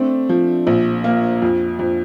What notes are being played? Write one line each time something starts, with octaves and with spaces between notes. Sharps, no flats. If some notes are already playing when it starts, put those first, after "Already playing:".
Already playing: A3 C4 D4
F3
A#1
A#3
F2
F2